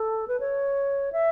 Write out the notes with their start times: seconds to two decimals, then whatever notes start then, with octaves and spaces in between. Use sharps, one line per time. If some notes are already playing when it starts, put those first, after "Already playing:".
Already playing: A4
0.28 B4
0.40 C#5
1.12 E5